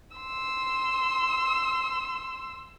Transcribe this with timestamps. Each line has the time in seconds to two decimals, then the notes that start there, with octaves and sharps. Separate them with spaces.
0.17 C6 E6